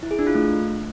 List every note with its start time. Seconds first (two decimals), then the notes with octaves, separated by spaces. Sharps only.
0.03 E4
0.11 G#4
0.19 D4
0.27 F4
0.35 A3